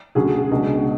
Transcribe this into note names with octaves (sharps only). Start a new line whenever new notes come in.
D2 D3 F#3 C#4 G#4
C#2 B2 G#3 D4